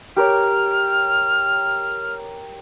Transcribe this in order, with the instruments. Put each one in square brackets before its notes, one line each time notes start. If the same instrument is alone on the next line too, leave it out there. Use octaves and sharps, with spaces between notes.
[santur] G4 A#4 C#5 [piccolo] F6